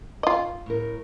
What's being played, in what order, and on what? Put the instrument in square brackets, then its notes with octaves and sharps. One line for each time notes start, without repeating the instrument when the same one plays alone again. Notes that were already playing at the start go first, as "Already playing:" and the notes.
[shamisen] F4 D#5
[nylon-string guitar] A2 A#4